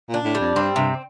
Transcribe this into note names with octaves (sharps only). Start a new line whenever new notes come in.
A#2
D4
A2
G3
F2
G2 C4
G2 C3